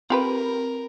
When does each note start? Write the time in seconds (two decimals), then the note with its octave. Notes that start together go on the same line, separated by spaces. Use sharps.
0.10 C4 F4 G4 A#4 B4